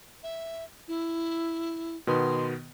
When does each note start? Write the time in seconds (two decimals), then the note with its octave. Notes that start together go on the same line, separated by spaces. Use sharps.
0.23 E5
0.88 E4
2.07 B2 D#3 B3 C6